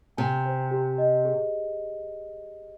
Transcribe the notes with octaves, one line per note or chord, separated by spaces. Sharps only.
C3 G#5
C5
G4
D#5
G#4